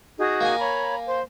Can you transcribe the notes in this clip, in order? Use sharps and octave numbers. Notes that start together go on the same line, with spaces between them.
D#4 F#4 G#4
A#3 G#5
C#5 A#5 B5
C5